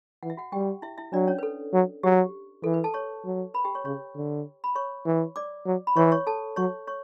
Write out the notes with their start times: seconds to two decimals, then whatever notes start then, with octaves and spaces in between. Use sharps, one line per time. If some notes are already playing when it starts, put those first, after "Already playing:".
0.23 E3 F#5
0.30 E5
0.37 F#4 F#5
0.52 G3 G4 G5
0.82 E4 E5
0.98 E4 E5
1.13 F#3 D4 D5
1.28 C#4 C#5
1.39 B4
1.43 A4
1.73 F#3
2.03 F#3 G4
2.64 E3 A4
2.74 B4
2.84 A4 A5
2.94 C#5 C#6
3.25 F#3
3.54 B4 B5
3.64 G4 G5
3.75 C#5 C#6
3.85 C#3 C#5 C#6
4.15 D3
4.64 B5
4.76 C#5 C#6
5.05 E3
5.36 D5 D6
5.66 F#3
5.87 B5
5.96 E3 C#5 C#6
6.12 C#5 C#6
6.27 A4 A5
6.56 F#3 C#5 C#6
6.87 C#5 C#6